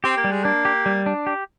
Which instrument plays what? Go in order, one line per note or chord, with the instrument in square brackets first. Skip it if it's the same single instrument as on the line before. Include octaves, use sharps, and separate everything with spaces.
[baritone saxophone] C4 [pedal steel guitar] G4
[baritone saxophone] A#3
[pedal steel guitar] G3
[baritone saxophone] G#3
[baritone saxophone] A#3 [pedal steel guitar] D4
[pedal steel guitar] G4
G3
D4
G4